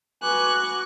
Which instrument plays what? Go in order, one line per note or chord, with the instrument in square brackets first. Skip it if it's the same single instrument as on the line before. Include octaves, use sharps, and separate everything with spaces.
[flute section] F#4 D6 [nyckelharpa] B4 [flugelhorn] G#5 [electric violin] C#6 F#6